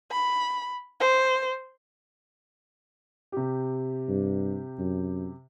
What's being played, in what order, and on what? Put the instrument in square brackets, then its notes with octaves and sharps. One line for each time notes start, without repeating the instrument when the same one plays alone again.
[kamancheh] B5
C5
[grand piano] C3 G4
[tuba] G2
F#2